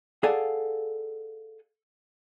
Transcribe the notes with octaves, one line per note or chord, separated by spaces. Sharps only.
G#4 A4 D5 F5 F#5 G#5